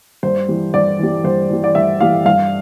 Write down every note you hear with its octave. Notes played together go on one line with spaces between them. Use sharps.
G2 C5
E3 G3
G2 D5
E3 G3
G2 C5
E3 G3
D5
G2 E5
E3 G3 F5
G2 F5